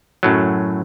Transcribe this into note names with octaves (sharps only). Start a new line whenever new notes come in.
F#2 A2 F#3